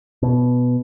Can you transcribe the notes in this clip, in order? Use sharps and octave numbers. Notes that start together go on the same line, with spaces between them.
B2